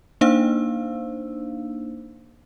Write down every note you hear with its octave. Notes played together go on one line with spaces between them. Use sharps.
A#3 D4 D#4 C5 F5 E6